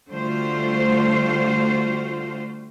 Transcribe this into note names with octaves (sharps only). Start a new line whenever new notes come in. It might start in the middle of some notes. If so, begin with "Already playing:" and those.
D3 G3 A3 F4 F#4 C5